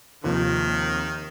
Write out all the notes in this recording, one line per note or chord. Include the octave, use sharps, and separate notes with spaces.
D#2 C3 D#3 F3